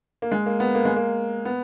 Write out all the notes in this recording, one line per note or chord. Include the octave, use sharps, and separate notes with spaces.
A#3
G#3
A#3
B3
A#3
G#3
A#3
B3